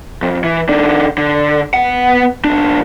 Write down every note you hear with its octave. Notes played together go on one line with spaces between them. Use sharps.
F2
E3
D#3 D4
D3
B3 F#5
B1 D4